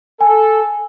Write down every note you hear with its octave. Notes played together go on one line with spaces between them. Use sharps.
A4 G#5